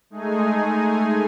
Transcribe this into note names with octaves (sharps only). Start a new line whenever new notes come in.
G#3 A3 D#4 G#4 G#5